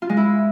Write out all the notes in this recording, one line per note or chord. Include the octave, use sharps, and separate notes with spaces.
F4
G#3
E4